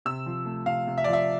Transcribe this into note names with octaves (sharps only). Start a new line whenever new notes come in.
C3 E6
F3
A3
C3 F5
C3
E5
D5
F3
E5